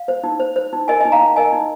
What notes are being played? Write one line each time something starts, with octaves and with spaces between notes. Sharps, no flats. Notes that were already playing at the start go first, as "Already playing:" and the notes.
Already playing: F5
C5
D#4
C5
C5
D#4
A#4 D#5 G#5
D#4 D#5 G#5
F5 A#5
D#4
A#4 D#5 G#5
D#4